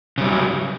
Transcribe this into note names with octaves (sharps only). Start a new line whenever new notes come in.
C#3 F#3 G3